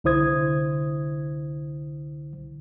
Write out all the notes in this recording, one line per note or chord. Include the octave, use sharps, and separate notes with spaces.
C2 D3 E4 C5 D#6 G#6